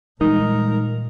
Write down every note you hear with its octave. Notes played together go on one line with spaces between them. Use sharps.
A#2 E3 G3 G#3 D#4 A#4